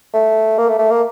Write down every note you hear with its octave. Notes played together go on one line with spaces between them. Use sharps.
A3
A#3
A3
A3
A#3